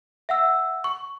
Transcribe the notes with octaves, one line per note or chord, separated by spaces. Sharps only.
E5 F#5 E6
C#6